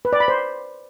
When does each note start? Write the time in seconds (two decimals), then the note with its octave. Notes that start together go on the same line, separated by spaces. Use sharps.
0.05 B4
0.13 D5
0.20 B5
0.28 C5